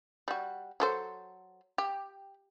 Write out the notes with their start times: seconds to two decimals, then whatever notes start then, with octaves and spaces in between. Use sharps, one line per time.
0.28 G3 F#4
0.80 F#3 A4 C5
1.78 G4